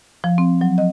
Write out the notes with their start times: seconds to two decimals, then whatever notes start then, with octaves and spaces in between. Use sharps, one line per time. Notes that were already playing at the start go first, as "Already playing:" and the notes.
0.24 F3
0.38 C4
0.61 F#3
0.78 D#5